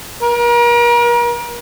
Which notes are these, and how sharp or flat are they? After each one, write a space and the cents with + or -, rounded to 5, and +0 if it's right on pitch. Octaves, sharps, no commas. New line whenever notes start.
A#4 +40